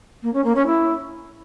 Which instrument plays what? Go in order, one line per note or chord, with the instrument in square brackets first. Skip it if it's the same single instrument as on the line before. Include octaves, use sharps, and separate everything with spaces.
[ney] A#3
C#4
A#3
C#4
E4